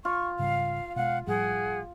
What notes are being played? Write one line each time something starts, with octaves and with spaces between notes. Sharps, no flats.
F4 C#6
G#2 C#3 G3 F5
B2 G#3 F5 F#5
A2 F3 G3 G#4 F#5